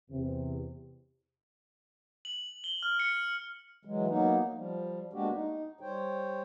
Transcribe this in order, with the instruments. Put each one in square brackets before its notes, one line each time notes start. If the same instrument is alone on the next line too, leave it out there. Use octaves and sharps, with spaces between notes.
[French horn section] E2 C3
[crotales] F#7
G7
F6
C#7
[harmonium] E3 F#3 G#3
F#3 A#3 B3 D#4
F3 G3
G#3 A#3 B3 D4 F#4 G4
D#4
G3 C5 C#5 G5